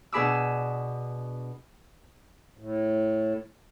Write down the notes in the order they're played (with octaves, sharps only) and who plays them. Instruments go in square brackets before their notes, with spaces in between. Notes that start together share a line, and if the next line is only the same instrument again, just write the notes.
[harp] B2 D4 G#4 B5 D6 E6
[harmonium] A2